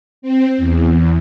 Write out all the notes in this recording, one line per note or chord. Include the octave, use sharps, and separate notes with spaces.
C4
E2